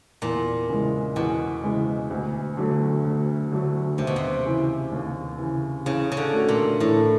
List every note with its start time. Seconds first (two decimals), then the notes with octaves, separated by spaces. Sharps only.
0.22 E2 A#2
0.69 C#3 E3 G#3
1.16 E2 B2
1.63 C#3 E3 G#3
2.10 D2
2.57 D3 F#3 A3
3.05 D2
3.51 D3 F#3 A3
3.98 D#2 C3
4.07 B2
4.16 C3
4.45 C#3 E3
4.92 D#2
5.39 C#3 E3
5.86 C#3 E3
6.12 C#3
6.17 D3
6.33 A3 C#4 F#4 A4
6.48 A#2
6.80 A2 E3